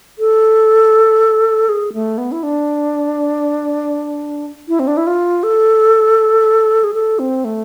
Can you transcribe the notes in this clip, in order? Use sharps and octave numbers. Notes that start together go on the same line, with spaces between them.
A4
G#4
A3
B3
E4
D4
E4
C4
D4
E4
F4
A4
G#4
A4
C4
A3